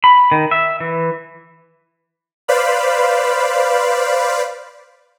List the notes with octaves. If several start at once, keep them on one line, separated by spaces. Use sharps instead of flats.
B5
D#3
E5
E3
B4 C5 D5 F5 B5